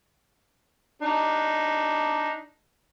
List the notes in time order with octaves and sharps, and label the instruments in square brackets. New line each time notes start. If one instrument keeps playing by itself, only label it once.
[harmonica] D4 D#4